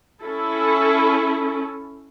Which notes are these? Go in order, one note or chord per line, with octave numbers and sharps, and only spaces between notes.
C#4 E4 A4